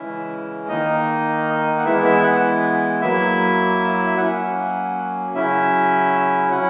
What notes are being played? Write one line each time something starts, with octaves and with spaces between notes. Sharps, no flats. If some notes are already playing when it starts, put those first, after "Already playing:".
Already playing: C#3 E3 G#3 C#4 E4 E5
D#3 A#3 D#4 D#5
F#5
E3 G#3 B3 E4 E5
E5
F#5
F#3 A#3 E4 E5
E5
F#3 A#3 C#4 F#5
C#3 F#3 C#4 E4 E5
F#3 C#4 E4 F#5